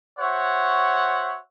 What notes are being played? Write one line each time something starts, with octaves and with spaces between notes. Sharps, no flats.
F#4 C5 C#5 E5 F#5